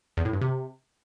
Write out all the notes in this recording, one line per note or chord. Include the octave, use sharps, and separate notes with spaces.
E2
A2
G2
C3